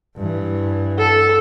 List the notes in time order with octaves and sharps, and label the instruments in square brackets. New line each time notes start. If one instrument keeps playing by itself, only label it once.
[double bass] G2 E3
[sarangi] A4